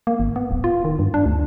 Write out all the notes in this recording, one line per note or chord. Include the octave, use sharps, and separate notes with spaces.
A#3
G#1
B3
D1
F4
D#3
G2
D4
D2